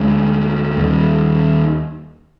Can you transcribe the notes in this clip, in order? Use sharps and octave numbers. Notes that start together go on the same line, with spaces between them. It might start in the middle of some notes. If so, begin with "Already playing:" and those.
Already playing: D2 D3 G#3
D#2 D#3 G3